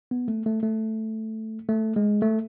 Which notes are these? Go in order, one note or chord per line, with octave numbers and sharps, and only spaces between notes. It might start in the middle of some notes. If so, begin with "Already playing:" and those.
B3
A3
A3
A3
A3
G#3
A3